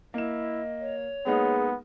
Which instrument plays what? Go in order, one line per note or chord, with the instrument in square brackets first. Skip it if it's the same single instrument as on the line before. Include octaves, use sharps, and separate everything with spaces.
[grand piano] A#3 E7 [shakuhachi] E4 [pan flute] D#5
[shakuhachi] C#5
[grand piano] G#3 A#3 D#4 [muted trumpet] B3 [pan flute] G#4